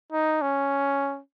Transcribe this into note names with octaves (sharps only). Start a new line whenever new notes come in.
D#4
C#4